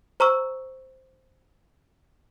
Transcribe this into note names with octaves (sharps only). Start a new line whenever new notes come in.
C5 A#5 C#6 E6